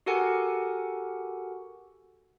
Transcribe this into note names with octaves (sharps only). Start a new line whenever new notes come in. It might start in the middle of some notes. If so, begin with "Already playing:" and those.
F#4 G4 A4 A#4 F#5 G#5